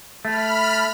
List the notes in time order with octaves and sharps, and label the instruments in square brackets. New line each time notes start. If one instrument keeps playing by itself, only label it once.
[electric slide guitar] A3 [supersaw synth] B5 F6